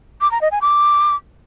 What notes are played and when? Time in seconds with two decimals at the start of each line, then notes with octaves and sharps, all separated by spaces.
0.21 D6
0.31 A#5
0.41 D#5
0.52 G#5
0.62 D6